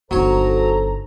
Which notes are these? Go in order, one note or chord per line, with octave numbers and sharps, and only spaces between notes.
G1 F#3 D#4 A4 C5 C#5 A#5